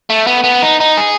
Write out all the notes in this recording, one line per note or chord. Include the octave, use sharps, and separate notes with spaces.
A3
B3
B3
D#4
D#4
G#4